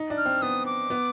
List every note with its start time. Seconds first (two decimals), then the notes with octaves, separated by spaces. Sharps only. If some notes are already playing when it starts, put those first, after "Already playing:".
Already playing: D#4
0.10 D4
0.18 F6
0.26 C4
0.42 B3 D#6
0.66 D6
0.90 B3